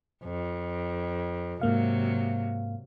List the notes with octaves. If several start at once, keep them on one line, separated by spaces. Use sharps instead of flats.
F2
G#2 C3 F#3 A#3 F5